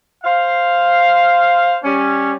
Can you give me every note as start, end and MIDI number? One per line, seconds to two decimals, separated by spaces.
0.24 1.77 72
0.24 1.77 77
1.83 2.33 55
1.83 2.33 61